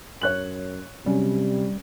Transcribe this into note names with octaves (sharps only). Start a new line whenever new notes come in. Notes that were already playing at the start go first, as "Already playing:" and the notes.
F#2 C#5 F#6 F#7
C3 F#3 G3 C#4